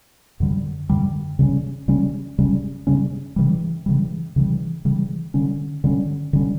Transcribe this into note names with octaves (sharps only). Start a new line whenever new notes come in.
F#2 D3 G3
F#2 D3 G3
C#3 G3 C#4
C#3 G3 C#4
C#3 G3 C#4
C#3 G3 C#4
C#3 E3 G3
C#3 E3 G3
C#3 E3 G3
C#3 E3 G3
D3 G3 C#4
D3 G3 C#4
D3 G3 C#4